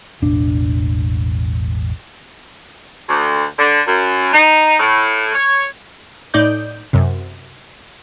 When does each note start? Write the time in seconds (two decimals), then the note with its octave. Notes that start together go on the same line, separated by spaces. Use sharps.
0.22 E1 A1 D4
3.09 D2
3.59 D3
3.87 F#2
4.33 D#4
4.80 A2
5.35 C#5
6.34 A2 D#4 D5 G6
6.93 F#2 C3